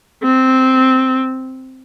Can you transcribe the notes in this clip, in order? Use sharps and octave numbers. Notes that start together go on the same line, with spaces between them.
C4